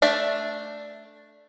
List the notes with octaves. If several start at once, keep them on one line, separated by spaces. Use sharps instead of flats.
A3 D4 D5 E5